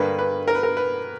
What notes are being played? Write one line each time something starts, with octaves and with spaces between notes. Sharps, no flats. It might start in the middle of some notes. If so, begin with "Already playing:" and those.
Already playing: G2 D3 A#3 B4
B4
A#4
B4
A#4
B4